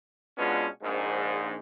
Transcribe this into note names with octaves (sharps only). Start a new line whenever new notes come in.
B2 G#3 B3 C#4 D4 F4
A#1 G#2